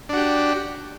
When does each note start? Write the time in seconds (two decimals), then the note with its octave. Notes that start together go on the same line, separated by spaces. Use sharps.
0.09 D4
0.13 F#4
0.17 G4